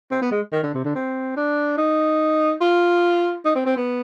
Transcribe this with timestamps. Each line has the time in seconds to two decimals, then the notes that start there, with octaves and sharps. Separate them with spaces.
0.11 C4
0.22 B3
0.31 G#3
0.52 D#3
0.63 D3
0.74 C3
0.84 D3
0.95 C4
1.36 D4
1.78 D#4
2.61 F4
3.45 D#4
3.55 C4
3.66 C4
3.76 B3